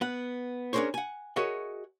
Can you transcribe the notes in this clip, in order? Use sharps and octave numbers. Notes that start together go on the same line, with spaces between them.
B3 F#5
C#4 D4 G#4 A#4 C5 C#5
F#5 G#5
F#4 G#4 A#4 C#5 D#5 E5